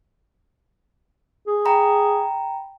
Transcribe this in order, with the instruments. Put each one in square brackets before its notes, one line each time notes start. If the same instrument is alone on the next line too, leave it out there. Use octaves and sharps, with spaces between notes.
[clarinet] G#4
[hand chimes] G5 A#5 B5